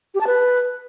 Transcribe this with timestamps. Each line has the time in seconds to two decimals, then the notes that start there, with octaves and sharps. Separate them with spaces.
0.15 G4
0.21 A5
0.27 B4